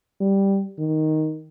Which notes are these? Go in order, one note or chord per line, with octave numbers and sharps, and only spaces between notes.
G3
D#3